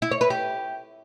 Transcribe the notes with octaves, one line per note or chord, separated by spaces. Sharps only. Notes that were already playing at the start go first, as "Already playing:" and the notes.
E4
C#5
B4
G4